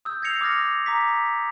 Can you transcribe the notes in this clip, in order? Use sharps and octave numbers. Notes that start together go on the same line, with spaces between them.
D#6 E6 G6
G6 G#6 A#6 C7 C#7 F7
D6 D#6 F6 A6 A#6
A#5 D6 B6